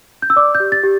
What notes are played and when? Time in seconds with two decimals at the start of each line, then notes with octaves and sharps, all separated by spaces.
0.22 G6
0.30 E6
0.36 D5 D6
0.55 G6
0.60 G4
0.72 A6
0.84 G4